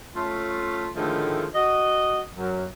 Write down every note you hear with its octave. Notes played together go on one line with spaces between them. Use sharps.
A3 C#4 F4
A2 D3 D#3 F3 G#3 A3
F#4 D#5
F#2